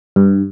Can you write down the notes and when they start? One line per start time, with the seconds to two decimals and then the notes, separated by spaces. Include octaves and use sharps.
0.16 G2